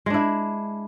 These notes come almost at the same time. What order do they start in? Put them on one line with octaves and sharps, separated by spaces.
G#3 D4 E4